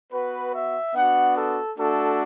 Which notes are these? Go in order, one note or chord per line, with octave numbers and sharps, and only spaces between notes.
B3 F#4 B4
E5
B3 D4 F#4 F#5
A4
A3 D4 F#4 A4